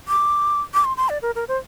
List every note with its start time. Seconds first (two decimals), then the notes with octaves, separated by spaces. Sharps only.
0.08 D6
0.74 D6
0.85 C6
0.97 C6
1.09 D5
1.22 A#4
1.35 A#4
1.48 C5